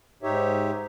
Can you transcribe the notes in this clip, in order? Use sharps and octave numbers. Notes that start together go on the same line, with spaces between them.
G#2 D#4 G4 C#5 E5